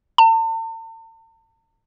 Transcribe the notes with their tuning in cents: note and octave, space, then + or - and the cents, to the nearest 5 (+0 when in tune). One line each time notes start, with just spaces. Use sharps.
A5 +45